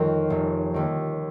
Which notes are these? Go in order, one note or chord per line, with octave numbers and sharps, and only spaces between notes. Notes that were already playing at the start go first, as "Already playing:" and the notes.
Already playing: F2 D#3 A#4 C#5
F1
D#2 D#3